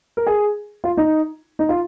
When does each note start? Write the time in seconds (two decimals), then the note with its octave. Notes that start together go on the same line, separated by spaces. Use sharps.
0.17 A#4
0.27 G#4
0.84 F4
0.97 D#4
1.59 D#4
1.69 F4